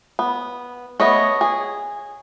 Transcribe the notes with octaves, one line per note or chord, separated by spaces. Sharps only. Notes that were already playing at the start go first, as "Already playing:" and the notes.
B3
A3 B3 C#5 D#5
G#4